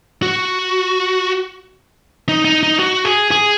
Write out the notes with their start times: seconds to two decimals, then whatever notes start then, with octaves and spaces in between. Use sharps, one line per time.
0.22 F#4
2.29 D#4
2.45 D#4
2.63 D#4
2.79 F#4
3.05 G#4
3.31 G#4